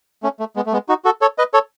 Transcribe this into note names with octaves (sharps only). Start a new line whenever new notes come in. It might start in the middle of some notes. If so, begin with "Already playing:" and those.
A3 C#4
A3
G#3 B3
A3
G#3 B3
D#4 F#4
F#4 A4
A4 C#5
B4 D#5
A4 C#5